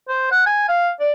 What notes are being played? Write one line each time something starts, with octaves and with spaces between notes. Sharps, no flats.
C5
F#5
G#5
F5
D5